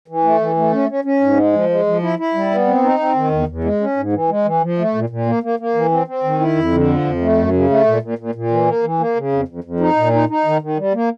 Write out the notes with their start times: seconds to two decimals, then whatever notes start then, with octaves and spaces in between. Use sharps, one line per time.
0.08 E3
0.24 A3
0.41 E3
0.56 A3
0.72 C#4
0.89 C#4
1.04 C#4
1.21 G#2
1.37 G#3
1.53 F3
1.70 G#3
1.86 F3
2.03 E4
2.19 E4
2.34 G3
2.51 B3
2.67 C4
2.83 D#4
2.99 C4
3.16 D#3
3.31 E2
3.48 E2
3.64 G#3
3.80 C#4
3.97 G#2
4.13 E3
4.29 G#3
4.45 E3
4.61 F3
4.78 A3
4.95 A#2
5.10 A#2
5.26 A#3
5.43 A#3
5.59 A#3
5.75 E3
5.91 C4
6.07 C4
6.24 D#3
6.40 E4
6.56 F2
6.72 D3
6.88 F3
7.04 F2
7.21 A3
7.37 F#2
7.53 C#3
7.70 A3
7.86 A#2
8.02 A#2
8.18 A#2
8.35 A#2
8.51 E3
8.66 A#3
8.83 E3
8.99 A#3
9.15 C#3
9.32 F2
9.48 F2
9.64 F2
9.80 D#4
9.96 A#2
10.13 D#4
10.29 D#4
10.45 D#3
10.62 D#3
10.77 G3
10.93 A#3